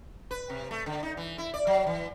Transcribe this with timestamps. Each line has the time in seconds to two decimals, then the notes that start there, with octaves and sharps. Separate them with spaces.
0.31 B4
0.50 C3
0.71 A3
0.86 D3
1.03 D#4
1.17 E3
1.38 E4
1.54 D5
1.67 F#3
1.86 E3